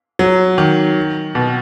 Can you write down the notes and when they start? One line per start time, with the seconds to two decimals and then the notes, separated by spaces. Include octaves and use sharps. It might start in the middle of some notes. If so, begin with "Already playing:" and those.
0.19 F#3
0.58 D#3
1.35 B2